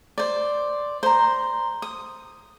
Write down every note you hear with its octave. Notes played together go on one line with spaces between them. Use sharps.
C5 D5
C5 A#5
D#6